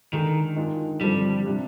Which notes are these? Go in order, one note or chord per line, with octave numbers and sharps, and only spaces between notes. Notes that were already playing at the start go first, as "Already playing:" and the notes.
D3 D#3 G#3 D#4
D#3 G#3 D4 F4
G2 D3 F3 G3 C4
C3 G3 D4 F4